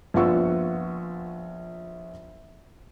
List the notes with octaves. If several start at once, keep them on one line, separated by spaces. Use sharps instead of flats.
A#1 B3 F4 F#5 C#6 E6